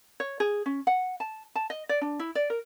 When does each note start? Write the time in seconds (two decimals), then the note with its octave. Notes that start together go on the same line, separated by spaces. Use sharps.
0.20 C#5
0.40 G#4
0.66 C#4
0.87 F#5
1.20 A5
1.55 A5
1.70 D#5
1.89 D5
2.01 D4
2.19 E4
2.35 D5
2.50 A#4